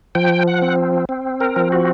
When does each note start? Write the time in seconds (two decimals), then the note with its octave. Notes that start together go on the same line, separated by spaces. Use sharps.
0.15 F3 G5
0.47 F#5
0.62 C4
1.09 C4
1.41 A#4
1.56 F3
1.72 F#4